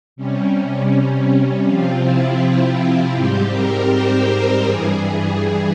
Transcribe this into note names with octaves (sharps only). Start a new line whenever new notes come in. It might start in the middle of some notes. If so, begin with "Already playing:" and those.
C3 G3 C#4
C3 F3 C4 F4
E4
E4
F4
G#2 G3 C4 G4
A#4
C5
A#4
G2 E3 G3 G#4